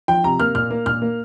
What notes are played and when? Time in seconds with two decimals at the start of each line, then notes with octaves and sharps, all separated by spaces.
0.08 F3 G5
0.24 C3 A#5
0.40 A#3 F6
0.55 A#2 F6
0.71 A#3
0.86 A#2 F6
1.02 A#3